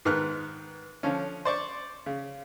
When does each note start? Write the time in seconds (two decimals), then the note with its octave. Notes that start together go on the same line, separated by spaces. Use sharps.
0.05 G#2 D#3 B3 F6 F#6
1.03 D3 F3 C#4
1.45 C5 D5 C#6 D6
2.06 C#3